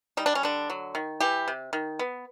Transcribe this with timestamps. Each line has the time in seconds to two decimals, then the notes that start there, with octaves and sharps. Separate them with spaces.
0.17 G3 D#4
0.26 D4
0.35 C#4
0.43 D3 D4
0.70 F#3
0.95 D#3
1.20 E3 G4
1.48 C3
1.73 D#3
1.99 B3